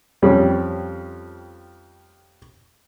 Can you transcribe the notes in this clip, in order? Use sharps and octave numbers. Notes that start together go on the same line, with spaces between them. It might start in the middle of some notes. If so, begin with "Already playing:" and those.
F2 G3 C#4